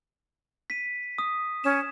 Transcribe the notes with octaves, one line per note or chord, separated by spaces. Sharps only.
B6 D#7
D#6
C#4 E7